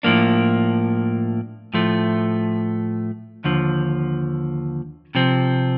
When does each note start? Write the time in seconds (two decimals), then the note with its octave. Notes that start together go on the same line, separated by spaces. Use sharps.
0.03 A2 F3 A#3 D4
1.74 A2 F3 A3
3.44 D#2 D3 F3
5.15 C3 F3 C4